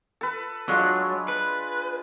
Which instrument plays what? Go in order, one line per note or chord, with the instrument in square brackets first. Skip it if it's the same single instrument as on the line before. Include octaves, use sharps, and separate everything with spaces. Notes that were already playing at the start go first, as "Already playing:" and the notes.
[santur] A4 B4
[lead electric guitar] F#3 [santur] G#3 D4 F4
[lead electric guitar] B4